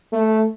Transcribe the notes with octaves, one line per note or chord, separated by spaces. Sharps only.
A3